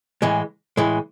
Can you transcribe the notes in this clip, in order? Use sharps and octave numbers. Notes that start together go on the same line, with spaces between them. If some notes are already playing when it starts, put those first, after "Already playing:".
A2 E3 G#3
A2 E3 G#3